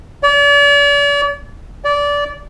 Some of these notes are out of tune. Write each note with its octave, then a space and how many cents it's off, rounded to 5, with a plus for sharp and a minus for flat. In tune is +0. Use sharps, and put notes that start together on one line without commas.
D5 -40
D5 -20